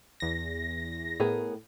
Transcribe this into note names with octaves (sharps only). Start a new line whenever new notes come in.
E2 A#6
A2 B3 G#4 A#4